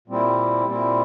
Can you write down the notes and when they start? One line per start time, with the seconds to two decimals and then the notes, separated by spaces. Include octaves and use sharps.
0.08 A#2 G3 C4 E4
0.66 A#2 G3 C4 E4